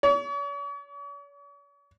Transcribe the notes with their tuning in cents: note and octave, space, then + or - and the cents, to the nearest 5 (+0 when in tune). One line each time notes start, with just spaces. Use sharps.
C#5 +45